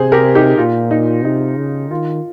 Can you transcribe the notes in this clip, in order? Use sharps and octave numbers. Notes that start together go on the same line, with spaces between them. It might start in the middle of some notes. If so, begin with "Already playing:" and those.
Already playing: C3 G#4 C5
G4 A#4
D#4 G4
A#2 F4
D#4
C3 D#4
C#3
D#3 F4